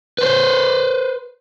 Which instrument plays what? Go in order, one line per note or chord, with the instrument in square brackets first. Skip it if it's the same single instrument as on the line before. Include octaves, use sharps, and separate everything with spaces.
[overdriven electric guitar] B4 C5